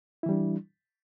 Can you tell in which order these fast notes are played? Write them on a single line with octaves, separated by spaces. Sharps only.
E4 E3 G3 D4